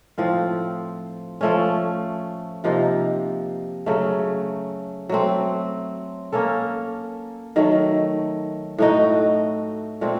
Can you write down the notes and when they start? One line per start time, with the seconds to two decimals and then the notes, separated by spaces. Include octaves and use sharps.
0.18 A2 F3 C4 F4
1.41 F3 A3 C#4
2.64 C3 F3 A#3 D#4
3.86 C#3 F#3 A3
5.09 F#3 A3 C4
6.32 A#3 C#4 A4
7.56 D#3 F#3 A3
8.78 A2 A3 D#4 F#4
10.01 A#2 A3 C4 F#4